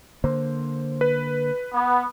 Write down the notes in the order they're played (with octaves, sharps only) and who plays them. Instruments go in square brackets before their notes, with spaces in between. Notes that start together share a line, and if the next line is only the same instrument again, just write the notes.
[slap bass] D3 A#3 [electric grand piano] C5
[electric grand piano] B4
[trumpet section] B3